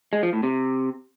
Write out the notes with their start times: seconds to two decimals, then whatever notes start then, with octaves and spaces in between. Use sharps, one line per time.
0.13 G#3
0.23 F3
0.33 A2
0.43 C3